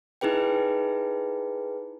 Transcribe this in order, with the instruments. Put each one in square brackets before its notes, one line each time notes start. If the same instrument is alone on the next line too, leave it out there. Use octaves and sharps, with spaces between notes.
[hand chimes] D#4 E4 G#4 B4 G5